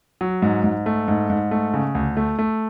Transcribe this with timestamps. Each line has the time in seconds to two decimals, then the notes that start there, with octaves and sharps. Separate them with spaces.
0.21 F#3
0.42 G#2
0.64 G#2
0.86 A3
1.08 G#2
1.30 G#2
1.51 A3
1.74 C#3
1.95 D2
2.17 A3
2.39 A3